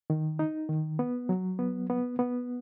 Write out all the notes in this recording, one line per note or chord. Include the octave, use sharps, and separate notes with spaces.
D#3
D#4
D#3
B3
F#3
B3
B3
B3